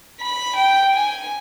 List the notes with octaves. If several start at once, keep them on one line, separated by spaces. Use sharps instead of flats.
B5
G5
G#5